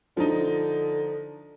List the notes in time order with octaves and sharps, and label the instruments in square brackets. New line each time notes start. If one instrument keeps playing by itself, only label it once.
[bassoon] D3 [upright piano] F3 D#4